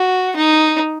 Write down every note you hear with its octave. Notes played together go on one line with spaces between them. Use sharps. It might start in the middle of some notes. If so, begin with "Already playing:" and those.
Already playing: F#4
D#4